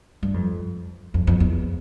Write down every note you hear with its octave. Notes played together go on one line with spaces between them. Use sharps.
G2
F2
F2
F2
E2